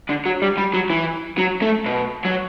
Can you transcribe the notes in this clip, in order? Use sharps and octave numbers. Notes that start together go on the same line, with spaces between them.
D3
F#3
G3
G3
F#3
E3
F#3
A3
B2
F#3